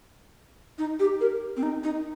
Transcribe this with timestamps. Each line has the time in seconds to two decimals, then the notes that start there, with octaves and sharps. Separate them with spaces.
0.79 D#4
1.00 G4
1.21 A#4
1.57 C4
1.63 D#4
1.84 D#4